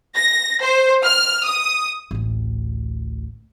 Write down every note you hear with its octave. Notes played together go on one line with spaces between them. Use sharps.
A#6
C5
F6
D#6
A1 D2